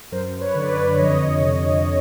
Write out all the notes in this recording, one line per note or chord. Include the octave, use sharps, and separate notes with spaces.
F#2 A#4 C5
B4 C#5
D3 D5
B4 C#5
F2 C#5 D#5
C3